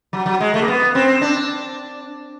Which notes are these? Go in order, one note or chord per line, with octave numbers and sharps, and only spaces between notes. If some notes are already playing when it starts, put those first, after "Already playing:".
F#3
F#3
G#3
A3
A#3
B3
C4
D4